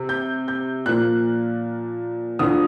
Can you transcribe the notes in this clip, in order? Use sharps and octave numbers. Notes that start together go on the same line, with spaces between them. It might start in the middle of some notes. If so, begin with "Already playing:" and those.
Already playing: C3
G6
G6
A#2 F3 A#3 F#6
D2 D3 F3 D#6